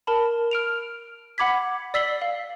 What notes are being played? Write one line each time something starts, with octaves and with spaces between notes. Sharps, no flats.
A#4 A5 B5
F6 D7 F7
F#5 B5 D6 G#6 B6
D5 E6 B6 C7 F#7 G7
F5